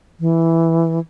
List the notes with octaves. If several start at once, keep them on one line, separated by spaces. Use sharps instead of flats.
E3